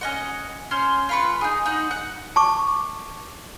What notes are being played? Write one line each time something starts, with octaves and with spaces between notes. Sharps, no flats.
C#4 D#5 F#5
C#4 C5 C6 F6
F4 B4 C#6
D#4 G#4
D#4 F#5
F#5
A5 C#6 D6